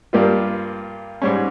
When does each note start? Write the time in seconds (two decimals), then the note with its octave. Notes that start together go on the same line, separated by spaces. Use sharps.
0.13 G2 G3 A#3 F4
1.22 G#2 G3 C#4